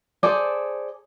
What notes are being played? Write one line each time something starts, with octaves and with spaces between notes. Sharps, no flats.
G#4 A4 C5 D5